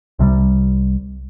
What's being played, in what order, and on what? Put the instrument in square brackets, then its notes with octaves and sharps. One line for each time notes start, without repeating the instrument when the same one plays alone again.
[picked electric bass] C2 C3 F#3 G3